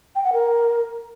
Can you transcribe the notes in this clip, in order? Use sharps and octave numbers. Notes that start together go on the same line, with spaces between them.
G5
F#5
A#4